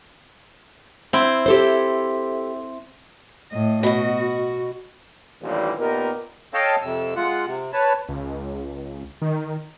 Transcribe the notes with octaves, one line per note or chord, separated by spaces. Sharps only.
C4 E4
G4 A4 C5
A2 D#5
B2 F#4 D#5
A1 D#2 A#2 D3 E3 G3
A#2 B3 D#4 G4 A#4
A4 C#5 D#5 F5 G5 A5
F2 C3 E6
G#3 F4 F#5
C3
B4 C#5 A5
C#2
D#3